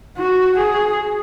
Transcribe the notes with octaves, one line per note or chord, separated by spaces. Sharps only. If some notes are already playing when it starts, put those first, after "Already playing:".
F#4
G#4